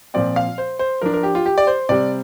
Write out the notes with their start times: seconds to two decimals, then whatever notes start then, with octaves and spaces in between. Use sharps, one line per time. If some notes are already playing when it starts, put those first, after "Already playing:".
0.14 A#2 F3 C4 D5
0.36 F5
0.58 C5
0.79 C5
1.02 F3 D4 A#4
1.14 A#4
1.23 G4
1.35 F4
1.46 G4
1.58 D5
1.67 C5
1.89 C3 G3 C4 D5